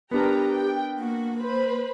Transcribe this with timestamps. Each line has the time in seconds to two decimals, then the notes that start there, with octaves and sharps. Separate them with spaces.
0.11 B3 D4 G4 A#4 B4 G5 A#5
0.50 G5
0.98 A#3 F#4
1.39 B4 C5 B5